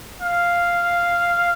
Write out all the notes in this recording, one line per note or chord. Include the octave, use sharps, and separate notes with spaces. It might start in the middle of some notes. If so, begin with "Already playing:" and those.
F5